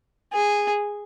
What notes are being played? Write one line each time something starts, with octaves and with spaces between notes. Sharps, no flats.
G#4